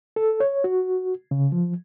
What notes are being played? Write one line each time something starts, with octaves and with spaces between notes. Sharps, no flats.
A4
C#5
F#4
C#3
F3